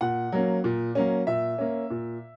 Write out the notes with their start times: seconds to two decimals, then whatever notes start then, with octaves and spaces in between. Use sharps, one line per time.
0.01 A#2 F#5
0.32 F#3 A#3 C#4
0.64 A#2
0.95 F#3 A#3 C#4
1.27 A#2 E5
1.58 A#3 C#4
1.90 A#2